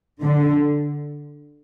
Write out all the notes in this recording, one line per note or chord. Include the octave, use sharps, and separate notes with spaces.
D3